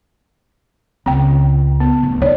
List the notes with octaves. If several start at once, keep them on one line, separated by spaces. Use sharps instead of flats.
C#2 C4 G5
B3
D1
D#3 C#5 D5